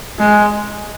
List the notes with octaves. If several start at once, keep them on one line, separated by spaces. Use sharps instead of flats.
G#3